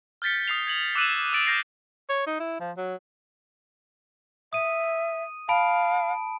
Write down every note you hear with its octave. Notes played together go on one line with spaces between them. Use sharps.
F6 G6 A6 B6 C#7
D#6 F6 C7 F7
G#6 F7 F#7
D6 E6 F#6 D#7 E7 F#7
E6 F#6 A6 D7 D#7 F#7
D6 F6 G6 A#6 C7
C#5
D#4
E4
F3
F#3
E5 D#6 D#7
F5 A5 B5 D7